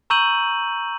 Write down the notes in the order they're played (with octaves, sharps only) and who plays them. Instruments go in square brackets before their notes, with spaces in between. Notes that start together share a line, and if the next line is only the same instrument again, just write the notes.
[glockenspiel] A#5 C#6 E6 G6 D#7 F#7